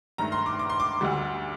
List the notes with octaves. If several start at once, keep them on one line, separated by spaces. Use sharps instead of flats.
G2 D#3 A3 A#5
C6
D6
D6
C6
D6
D2 D3 G3